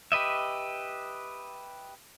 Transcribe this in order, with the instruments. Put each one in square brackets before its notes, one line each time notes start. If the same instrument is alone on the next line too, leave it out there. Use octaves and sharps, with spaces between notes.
[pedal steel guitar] G4 B4 D#5 E5